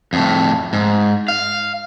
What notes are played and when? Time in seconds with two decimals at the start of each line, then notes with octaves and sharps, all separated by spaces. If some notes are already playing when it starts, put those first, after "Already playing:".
0.13 F2 A2
0.73 G#2
1.28 F5